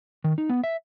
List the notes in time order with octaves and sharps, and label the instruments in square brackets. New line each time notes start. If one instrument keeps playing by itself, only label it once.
[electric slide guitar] D#3
D#4
B3
E5